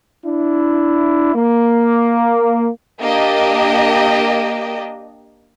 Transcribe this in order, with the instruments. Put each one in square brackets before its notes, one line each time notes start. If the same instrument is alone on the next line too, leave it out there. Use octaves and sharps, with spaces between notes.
[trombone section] D4 E4
A#3
[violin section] A#3 D4 G4 D#5